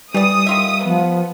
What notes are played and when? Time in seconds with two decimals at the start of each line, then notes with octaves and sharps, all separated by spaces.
0.14 E3 G3 D5 D#6
0.46 D#3 F4 E5
0.85 F3 B3